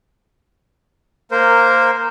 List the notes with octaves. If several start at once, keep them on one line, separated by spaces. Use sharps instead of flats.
A#3 A#4 C5